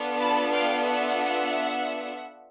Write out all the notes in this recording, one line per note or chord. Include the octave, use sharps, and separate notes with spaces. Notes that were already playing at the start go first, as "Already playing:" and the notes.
Already playing: B3 D4 F4 A4
A5 B5
F5 G5
E5 F#5